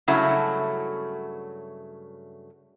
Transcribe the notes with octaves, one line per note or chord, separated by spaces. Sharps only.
G2 C#3 F#3 A3 E4 F#4